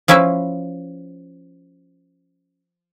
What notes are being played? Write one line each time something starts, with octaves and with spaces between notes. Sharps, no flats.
F3 C#4 E4 B4 E5